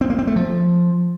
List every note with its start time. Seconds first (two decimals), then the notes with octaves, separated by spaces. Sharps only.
0.01 C4
0.10 A#3
0.19 C4
0.27 A3
0.36 F3